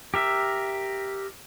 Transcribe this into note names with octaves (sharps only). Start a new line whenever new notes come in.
G4 A#4 E5